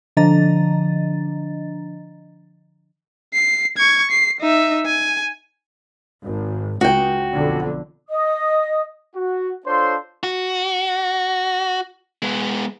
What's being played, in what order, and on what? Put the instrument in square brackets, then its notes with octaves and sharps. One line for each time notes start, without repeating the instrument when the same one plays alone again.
[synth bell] D3 F3 D4 D#5 A#5 A6
[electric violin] C7
C#6 G#6
C7
D#4 E5
G#5
[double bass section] G#1
[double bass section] C#2 [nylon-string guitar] F#4 G5
[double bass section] B1 F2 D3
[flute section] D#5 D#6
[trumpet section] F#4
D4 F4 A4 C5 C#5 C6
[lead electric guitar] F#4
G#3 B3